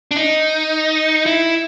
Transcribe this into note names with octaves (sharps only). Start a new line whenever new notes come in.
D4
D#4
E4